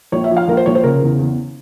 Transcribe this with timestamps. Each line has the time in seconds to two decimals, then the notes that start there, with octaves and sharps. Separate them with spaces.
0.12 A#1 C#5
0.24 E5
0.31 F3
0.37 F5
0.48 A#1 A#4
0.57 C5
0.66 A#1 C#5
0.75 C5
0.83 C#3 A#4
1.02 E2
1.19 E2